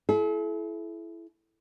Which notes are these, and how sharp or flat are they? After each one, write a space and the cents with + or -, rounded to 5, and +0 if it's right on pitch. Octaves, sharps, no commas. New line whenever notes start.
E4 +15 A4 -45